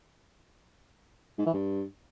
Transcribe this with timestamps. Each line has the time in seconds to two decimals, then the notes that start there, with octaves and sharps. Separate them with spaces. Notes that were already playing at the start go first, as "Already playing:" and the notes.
1.38 G#2
1.46 E3
1.53 G2